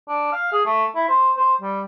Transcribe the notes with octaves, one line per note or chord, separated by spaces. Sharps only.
D4
F5
G#4
A3
E4
C5
C5
G3